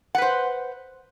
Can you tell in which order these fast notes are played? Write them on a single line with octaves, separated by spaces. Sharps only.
F#5 B4 C5